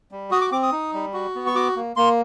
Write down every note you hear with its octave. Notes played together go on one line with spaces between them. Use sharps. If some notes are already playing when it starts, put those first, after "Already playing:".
G3
F#4 D#6
D6
C4 D6
D#6
D#4
G3
F#4
B3
C#6
F#4 D6
A#3
A#3 C6